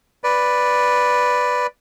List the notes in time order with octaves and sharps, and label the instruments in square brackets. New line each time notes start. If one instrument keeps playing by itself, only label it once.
[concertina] B4 D5